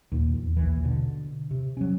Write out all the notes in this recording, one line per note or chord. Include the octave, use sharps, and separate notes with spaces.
D#2 A#2
E2
A#1 D#2 E3
B2 D3
C3
F#3 C#4